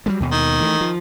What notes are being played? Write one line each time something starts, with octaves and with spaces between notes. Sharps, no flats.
F#3 G3 A3
D#2 B2
D#3
E3 F#3 A3
F3